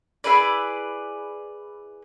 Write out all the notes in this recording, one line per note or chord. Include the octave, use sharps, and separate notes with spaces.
E4 G#4 B4 D5